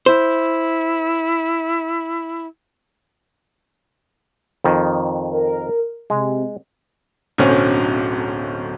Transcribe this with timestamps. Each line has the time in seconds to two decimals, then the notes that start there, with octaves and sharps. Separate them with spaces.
0.06 E4 C5
4.64 F2 D#3
5.32 A#4
6.10 C3 G#3
7.38 D1 B1 D3 C4 C#4